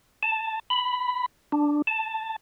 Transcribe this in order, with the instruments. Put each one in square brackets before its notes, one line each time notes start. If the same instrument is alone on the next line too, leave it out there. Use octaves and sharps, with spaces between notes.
[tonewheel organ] A5
B5
D4
A5